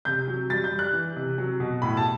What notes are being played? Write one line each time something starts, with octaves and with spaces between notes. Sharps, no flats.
C3 G6
F#3
G3 A6
G6
G3
F#6
E3
C3
F#3
B2
A2 B5
A5